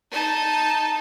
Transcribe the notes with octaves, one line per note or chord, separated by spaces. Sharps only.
D#4 A5